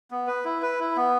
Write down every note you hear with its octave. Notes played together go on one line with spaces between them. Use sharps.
B3
B4
E4
B4
E4
B3